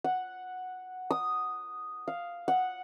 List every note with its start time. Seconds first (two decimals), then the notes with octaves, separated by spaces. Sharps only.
0.04 F#5
1.11 D#6
2.08 F5
2.48 F#5